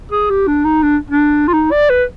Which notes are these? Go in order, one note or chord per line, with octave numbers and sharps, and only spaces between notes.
G#4
G4
D4
D#4
D4
D4
F4
D#4
D5
B4